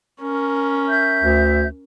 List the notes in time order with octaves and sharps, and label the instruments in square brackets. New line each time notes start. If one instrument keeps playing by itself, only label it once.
[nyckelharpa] C#4 A#4
[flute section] E5 G6
[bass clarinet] D2